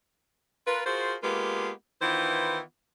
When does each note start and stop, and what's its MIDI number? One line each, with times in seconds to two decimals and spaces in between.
0.67 0.84 65
0.67 0.84 70
0.67 0.84 71
0.86 1.15 65
0.86 1.15 66
0.86 1.15 68
0.86 1.15 70
0.86 1.15 72
1.23 1.71 56
1.23 1.71 58
1.23 1.71 59
1.23 1.71 65
1.23 1.71 67
1.23 1.71 71
2.02 2.61 51
2.02 2.61 52
2.02 2.61 59
2.02 2.61 64
2.02 2.61 65
2.02 2.61 72